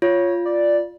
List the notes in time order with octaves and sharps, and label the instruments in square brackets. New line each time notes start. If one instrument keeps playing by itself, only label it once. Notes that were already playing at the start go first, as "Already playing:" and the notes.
[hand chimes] F4 [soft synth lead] C#5
[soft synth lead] D5